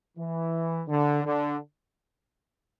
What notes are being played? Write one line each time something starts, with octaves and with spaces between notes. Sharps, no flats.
E3
D3
D3